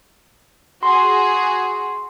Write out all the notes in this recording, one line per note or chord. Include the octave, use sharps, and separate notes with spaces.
F#4 G#4 C6